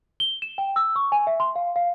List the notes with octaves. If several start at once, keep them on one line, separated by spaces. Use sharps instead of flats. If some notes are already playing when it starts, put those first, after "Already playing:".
G7
E7
G5
E6
C#6
G#5
E5
C6
F5
F5